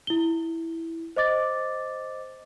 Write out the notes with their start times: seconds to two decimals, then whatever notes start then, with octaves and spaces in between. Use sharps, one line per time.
0.07 E4 G7
1.16 C5 D#5 D6 A6